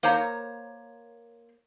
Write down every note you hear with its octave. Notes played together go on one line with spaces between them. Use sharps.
A#3 C5 C#5 A#5